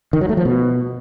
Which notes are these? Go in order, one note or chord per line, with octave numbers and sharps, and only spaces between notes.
D#3
F#3
A3
F3
B2